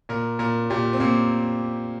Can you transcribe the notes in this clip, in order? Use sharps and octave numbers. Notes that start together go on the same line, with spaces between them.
A#2 A#4
A#2 A#4
A#2 G4
C4
A#2 A#3